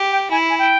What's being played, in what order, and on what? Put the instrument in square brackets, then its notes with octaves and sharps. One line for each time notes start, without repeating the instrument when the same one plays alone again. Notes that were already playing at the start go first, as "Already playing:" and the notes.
Already playing: [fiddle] G4
[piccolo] G5
[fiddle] E4 [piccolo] G#5
[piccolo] G#5
G5